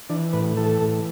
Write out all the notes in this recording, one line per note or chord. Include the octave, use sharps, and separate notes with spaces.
E3 D4
A2 B4
E3 A4
A2